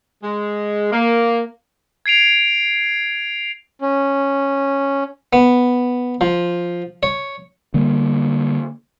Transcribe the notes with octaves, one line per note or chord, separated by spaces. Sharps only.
G#3
A#3
G#6 C7 D7 F7
C#4
B3
F3
C#5
D3 G3 A#3